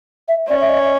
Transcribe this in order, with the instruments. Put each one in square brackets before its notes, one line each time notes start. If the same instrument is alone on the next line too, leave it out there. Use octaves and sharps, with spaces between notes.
[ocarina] E5
[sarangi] C#4 [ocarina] D5
[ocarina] E5
D#5